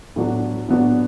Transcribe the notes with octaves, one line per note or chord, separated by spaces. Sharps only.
A2 F#3 B3 D4 F#4
A2 F#3 B3 D4 F#4